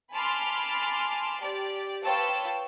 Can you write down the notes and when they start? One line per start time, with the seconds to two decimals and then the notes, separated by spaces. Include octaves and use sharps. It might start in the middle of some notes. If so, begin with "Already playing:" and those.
0.12 G#5 A5 B5 C6 D6 F6
1.40 G4 D5
2.03 F4 B4 C#5 G5 A5 E6